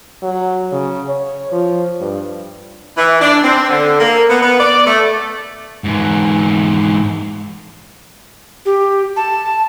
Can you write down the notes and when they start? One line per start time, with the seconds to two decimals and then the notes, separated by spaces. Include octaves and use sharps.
0.22 F#3
0.72 C#3
1.08 C#5
1.52 F3
2.00 G2
2.98 E3
3.21 D4
3.44 C4
3.70 D3
4.00 A#3
4.30 B3
4.42 B3
4.60 D5
4.87 A3
5.84 G#2 E3
8.65 G4
9.16 A5